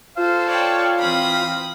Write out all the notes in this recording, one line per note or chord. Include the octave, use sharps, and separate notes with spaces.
F4 A4 C5 F5
C#5 D5 G5
E3 C4 B5 D#6